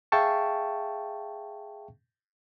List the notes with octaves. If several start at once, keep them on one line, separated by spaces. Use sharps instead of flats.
G#4 E5 F5 G5 A5 C#6